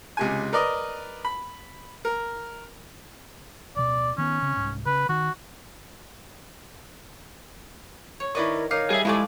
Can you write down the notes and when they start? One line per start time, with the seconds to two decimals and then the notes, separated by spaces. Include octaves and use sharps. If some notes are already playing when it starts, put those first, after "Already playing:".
0.17 C#2 C3 G#5
0.53 A#4 B4 D5 D#5
1.25 B5
2.05 A#4
3.76 D1 B2 D5
4.18 D#3 B3 C#4
4.42 C#3 C4
4.57 C2 G#2
4.86 C#3 B4
5.09 D#3 F#4
8.20 C#5
8.35 D#3 E4 A#4 B4 D5 D#5 C#6
8.71 D#4 A#4 C#5 F5 D6 F6 C7
8.90 G3 G#4 E5 G#5
9.05 F3 G#3 A3 E4 G4 A4 D5 G#5